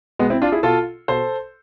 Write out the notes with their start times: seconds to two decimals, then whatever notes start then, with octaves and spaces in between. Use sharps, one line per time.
0.19 B2 G#3 B3
0.30 C4 E4
0.42 D4 F4
0.52 E4 G#4
0.63 B2 F4 A4
1.08 B2 A4 C5